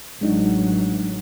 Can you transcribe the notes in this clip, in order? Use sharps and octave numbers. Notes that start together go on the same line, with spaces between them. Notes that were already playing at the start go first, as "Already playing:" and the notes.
A1 F#3 G#3 D4 D#4